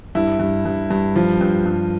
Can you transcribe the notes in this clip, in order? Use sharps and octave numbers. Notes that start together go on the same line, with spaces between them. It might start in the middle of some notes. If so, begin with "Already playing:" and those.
G2 E4
G2
G2
G2
F3
G2
G2